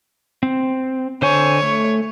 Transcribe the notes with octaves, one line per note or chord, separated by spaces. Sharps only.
C4
D3 C5 C#5 G#5
A3